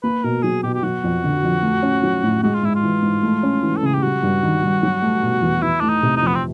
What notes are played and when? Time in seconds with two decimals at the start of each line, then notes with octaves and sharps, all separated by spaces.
0.03 A#3 B4
0.24 B2 A#4
0.43 F#3 G#4
0.63 B2 G4
0.74 G4
0.83 F#3 F#4
1.04 F2
1.24 D3
1.44 F2
1.63 A3
1.83 C#4
2.03 F#3
2.24 A2
2.43 G#3 F#4
2.54 F4
2.63 G#2 E4
2.76 F4
2.83 E3
3.02 G#2
3.23 A3
3.43 C#4
3.63 E3
3.77 A4
3.83 C#3 G#4
3.94 G4
4.03 G3 F#4
4.23 G2
4.43 D#3
4.63 G2
4.83 F#3
5.02 A3
5.23 B2
5.42 E2
5.62 E3 E4
5.80 A3 D4
5.89 D#4
6.03 C3
6.16 D#4
6.22 F2 B3
6.35 C4